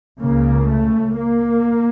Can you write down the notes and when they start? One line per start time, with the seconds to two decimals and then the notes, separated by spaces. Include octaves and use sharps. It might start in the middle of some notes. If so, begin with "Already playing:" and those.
0.22 C#2 C#3 A#3
0.70 A3
1.17 A#3